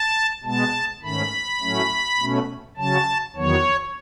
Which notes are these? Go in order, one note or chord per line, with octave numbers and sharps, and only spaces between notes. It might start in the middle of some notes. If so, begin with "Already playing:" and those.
Already playing: A5
B2 G#3 B3 A5
G#2 D#3 A3 C#4 B5
A2 F#3 A3 C#4
B2 A3 C#4
C#3 F#3 C#4 A5
E2 D#3 F#3 B3 C#5